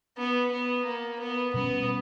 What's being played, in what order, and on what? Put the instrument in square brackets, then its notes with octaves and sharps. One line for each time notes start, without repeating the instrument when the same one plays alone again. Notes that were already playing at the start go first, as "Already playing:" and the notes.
[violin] B3
B3
A#3
B3
[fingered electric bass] B2 G3 C#4 [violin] B3